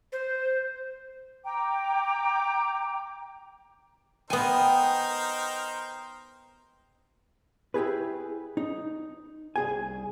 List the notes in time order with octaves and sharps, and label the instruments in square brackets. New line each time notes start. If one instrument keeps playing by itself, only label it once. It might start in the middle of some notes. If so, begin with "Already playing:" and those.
[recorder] C5
[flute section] G5 A#5 D6
[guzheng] B3 G#5 [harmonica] D#4 A#4 C5 [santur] G5
[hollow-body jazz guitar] E4 G4 G#4 B4
D#4
C2 G#4 G#5